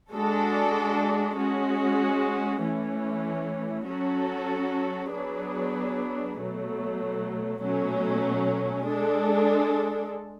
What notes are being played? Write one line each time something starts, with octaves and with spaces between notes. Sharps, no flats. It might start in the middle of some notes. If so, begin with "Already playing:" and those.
G#3 D4 F#4 A4
G#3 C#4 F#4
E3 A3 C#4
F#3 C#4 F#4 A4
F#3 B3 D4 G#4 B4
B2 F#3 A3
B2 F#3 A3 C#4
G#3 D4 A4